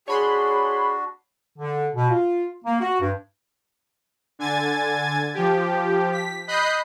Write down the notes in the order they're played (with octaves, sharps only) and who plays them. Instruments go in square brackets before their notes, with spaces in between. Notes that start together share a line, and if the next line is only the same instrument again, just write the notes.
[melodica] D4 F#4 [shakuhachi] G#4 [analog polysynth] C#5 B5 C6
[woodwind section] D3
B2
F4
A#3
F#4
G2
[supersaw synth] D3 G#5 G#6 A6
F3 G4
B6
D#5 B5 D#6 F#6 G6 C7